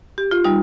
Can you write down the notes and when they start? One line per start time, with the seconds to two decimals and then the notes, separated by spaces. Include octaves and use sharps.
0.18 G4
0.31 F4
0.45 G3 D#4